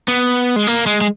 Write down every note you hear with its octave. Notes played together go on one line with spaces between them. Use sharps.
B3
G#3
A#3
G#3
G#3